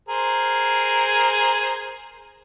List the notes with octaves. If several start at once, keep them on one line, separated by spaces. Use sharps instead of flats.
G#4 A#4 C5